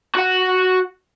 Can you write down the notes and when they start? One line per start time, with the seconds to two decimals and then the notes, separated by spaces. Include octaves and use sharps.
0.15 F#4 F#5